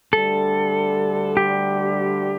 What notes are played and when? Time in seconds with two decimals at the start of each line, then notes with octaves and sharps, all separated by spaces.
0.13 D2 D3 G3 A4
1.37 G4